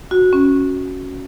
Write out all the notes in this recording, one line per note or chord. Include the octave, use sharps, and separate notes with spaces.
F#4
C#4